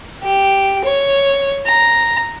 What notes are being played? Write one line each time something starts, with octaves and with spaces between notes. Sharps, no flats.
G4
C#5
A#5